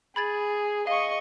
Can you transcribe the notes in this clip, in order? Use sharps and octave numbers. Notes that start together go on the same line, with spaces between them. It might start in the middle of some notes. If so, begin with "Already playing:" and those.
G#4 B5 G#6 A6
D#5 F5 C#6